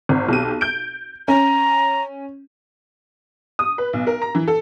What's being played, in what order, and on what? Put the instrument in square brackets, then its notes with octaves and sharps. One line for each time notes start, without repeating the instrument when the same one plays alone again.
[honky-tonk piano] G#1
B1 G4 D#7
G6 D7
[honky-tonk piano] C#4 [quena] A#5
[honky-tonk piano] D#6
B4
B1
A#4
A#5
E3
A4